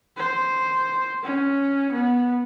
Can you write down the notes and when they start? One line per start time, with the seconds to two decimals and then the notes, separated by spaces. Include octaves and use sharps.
0.17 C5
1.23 C#4
1.92 B3